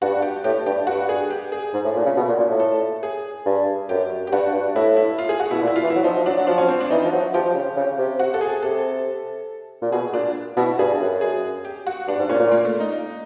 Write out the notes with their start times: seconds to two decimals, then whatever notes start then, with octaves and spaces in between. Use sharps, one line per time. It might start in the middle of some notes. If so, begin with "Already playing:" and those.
0.02 G2 F#4
0.22 G4
0.44 A2 G4
0.66 G2 G4
0.87 G2 F#4
1.09 G#4
1.30 G4
1.52 G#4
1.74 G#2
1.84 A2
1.96 A#2
2.05 C#3
2.16 B2
2.28 A#2
2.38 A#2
2.50 A2
2.60 A4
3.03 G#4
3.46 G2
3.89 F#2 G4
4.27 G4
4.32 G2 F#4
4.53 G2
4.75 A2 E4
4.97 E4
5.18 F4
5.29 G#4
5.40 F#4
5.51 B2 E4
5.62 A#2
5.68 E4
5.76 F4
5.83 E3
5.90 E4
5.95 F#3
6.04 F3 D#4
6.26 F#3 D4
6.38 F#3
6.47 F3 D4
6.58 C#4
6.69 C4
6.80 D4
6.90 E3 D#4
7.05 F3
7.12 F#3
7.34 F3 G4
7.55 C#3
7.77 C#3
7.98 C3
8.19 F#4
8.34 A4
8.41 G#4
8.63 C3 A4
9.82 A#2
9.92 B2 G#4
10.13 A#2 D4
10.57 B2 E4
10.78 G2 G#4
11.01 F#2
11.21 G#4
11.65 G4
11.87 F#4
12.08 G2 D4
12.19 G#2
12.29 A#2 C#4
12.40 A#2
12.51 A#3
12.65 A3
12.80 D#4